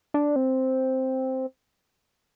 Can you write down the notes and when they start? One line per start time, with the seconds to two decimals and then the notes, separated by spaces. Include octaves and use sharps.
0.14 D4
0.36 C4